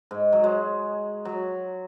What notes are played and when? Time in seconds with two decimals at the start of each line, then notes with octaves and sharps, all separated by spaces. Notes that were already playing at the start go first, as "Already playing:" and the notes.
0.11 G#2
0.32 F#3
0.44 G#3
1.25 F#3